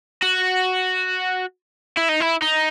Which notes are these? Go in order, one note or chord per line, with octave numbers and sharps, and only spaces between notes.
F#4
E4
D#4
E4
D#4